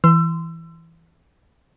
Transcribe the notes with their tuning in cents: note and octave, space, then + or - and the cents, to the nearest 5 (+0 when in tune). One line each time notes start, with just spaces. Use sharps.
E3 +0 C6 -20 E6 +25